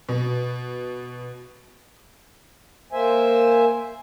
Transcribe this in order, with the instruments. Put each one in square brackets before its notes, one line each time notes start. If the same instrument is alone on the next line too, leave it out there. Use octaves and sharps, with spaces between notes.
[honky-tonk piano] B2
[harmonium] A#3 C5 E5 G#5